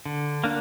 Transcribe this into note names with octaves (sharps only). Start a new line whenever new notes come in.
D3
A#3 D4